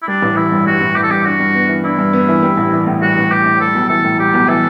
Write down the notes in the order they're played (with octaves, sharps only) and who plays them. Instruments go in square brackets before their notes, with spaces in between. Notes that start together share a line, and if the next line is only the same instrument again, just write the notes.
[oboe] E4
[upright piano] G3 [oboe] D4
[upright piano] A1
[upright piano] E3 [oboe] E4
[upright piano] G2
[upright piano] G3 [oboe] F#4
[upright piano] A1
[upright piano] E3 [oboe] G4
[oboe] A4
[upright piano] G2 [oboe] G4
[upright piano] D4 [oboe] F#4
[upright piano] G2
B3
E3
[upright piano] D4 [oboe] E4
[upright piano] G2
B3
E3
G3
A1
E3
A2
[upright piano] G3 [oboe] F#4
[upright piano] A1
[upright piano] E3 [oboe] G4
[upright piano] A2
[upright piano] G3 [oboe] A4
[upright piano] B1
[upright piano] E3 [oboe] A4
[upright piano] A2
[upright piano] G3 [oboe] G4
[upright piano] B1
[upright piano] E3 [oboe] A4